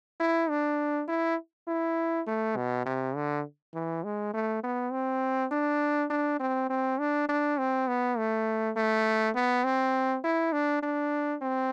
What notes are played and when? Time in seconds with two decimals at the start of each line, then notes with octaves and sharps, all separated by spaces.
0.20 E4
0.50 D4
1.08 E4
1.68 E4
2.27 A3
2.56 B2
2.86 C3
3.16 D3
3.74 E3
4.04 G#3
4.34 A3
4.64 B3
4.92 C4
5.52 D4
6.10 D4
6.40 C4
6.70 C4
6.99 D4
7.29 D4
7.58 C4
7.88 B3
8.18 A3
8.76 A3
9.35 B3
9.64 C4
10.24 E4
10.53 D4
10.83 D4
11.42 C4